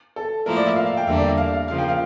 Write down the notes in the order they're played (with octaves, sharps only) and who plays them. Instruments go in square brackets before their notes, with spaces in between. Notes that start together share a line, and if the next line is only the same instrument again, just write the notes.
[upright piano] A4
[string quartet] A2 F3 A#3 E4 [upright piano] A#4
[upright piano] D5
E5
F5
F5
G5
[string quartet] E2 D3 G3 A#3 D4 [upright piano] E5
[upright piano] D5
E5
F5
F5
[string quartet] C#3 F3 A#3 [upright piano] F5
[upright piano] G5
F5